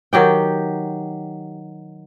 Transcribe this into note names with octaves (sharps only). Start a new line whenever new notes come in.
D#3 F#3 G4 G5